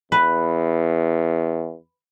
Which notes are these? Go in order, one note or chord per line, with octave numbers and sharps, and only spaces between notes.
E2 B4